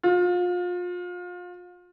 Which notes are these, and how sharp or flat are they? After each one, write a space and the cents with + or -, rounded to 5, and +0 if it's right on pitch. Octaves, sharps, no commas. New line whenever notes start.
F4 +30